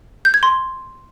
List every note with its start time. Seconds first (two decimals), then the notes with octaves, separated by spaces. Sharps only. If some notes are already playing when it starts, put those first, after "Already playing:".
0.25 G6
0.34 G#6
0.43 C6